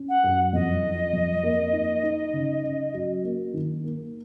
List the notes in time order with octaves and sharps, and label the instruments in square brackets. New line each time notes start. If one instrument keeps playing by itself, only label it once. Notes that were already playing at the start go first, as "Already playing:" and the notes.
Already playing: [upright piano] C#4
[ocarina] F#5
[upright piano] F#2
[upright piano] F2 [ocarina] D#5
[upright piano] F3
F2
A#3
D#4
D#4
C#3
C#4
F#3
A#3
D#3
A#3